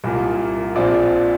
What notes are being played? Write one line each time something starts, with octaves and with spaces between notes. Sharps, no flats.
C2 A#2 A#3
A#1 A#2 F3 C4 F4 D5 D6